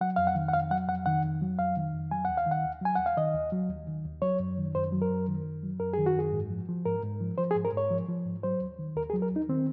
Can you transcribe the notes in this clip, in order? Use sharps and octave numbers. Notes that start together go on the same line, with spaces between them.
F#3 F#5
F2 F5
F#5
D#3
F#5
F2 F5
F#3 F#5
F2 F#5
D#3 F#5
F2
F#3
F2 F5
D#3
F2
F#3 G#5
D#2 F#5
F5
D#3 F#5
D#2
F#3 G#5
D#2 F#5
F5
D#3 D#5
D#2
F#3
D#2
D#3
D#2
F#3 C#5
F#2
D#3
F#2 C5
F#3
A#4
F#2
D#3
F#2
F#3
F#2 A#4
D#3 G#4
F#4
F#2 G#4
G#2
F3
F3
G#2 A#4
G#2
F3
F3 C5
G#4
G#2
A#4
G#2 C#5
F3
F3
G#2
F#3 C5
D#2
D#3
D#2 A#4
G#4
F#3
A#4
D#2 D#4
D#3 C4